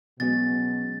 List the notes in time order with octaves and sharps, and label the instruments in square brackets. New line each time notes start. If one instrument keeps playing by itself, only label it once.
[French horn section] B2 [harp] F#3 G#3 C#4 [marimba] B3 [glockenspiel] A6